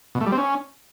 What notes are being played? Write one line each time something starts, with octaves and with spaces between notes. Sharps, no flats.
B2
A3
G3
C4
C#4